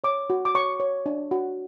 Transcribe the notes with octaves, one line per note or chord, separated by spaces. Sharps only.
C#5 D6
F#4
D6
C#5 C#6
C#5
D4
F#4